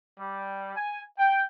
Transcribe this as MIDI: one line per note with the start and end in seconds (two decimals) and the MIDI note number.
0.18 0.74 55
0.75 1.00 80
1.17 1.44 79